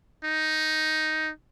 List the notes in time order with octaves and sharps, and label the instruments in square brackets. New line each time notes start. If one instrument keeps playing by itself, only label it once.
[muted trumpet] D#4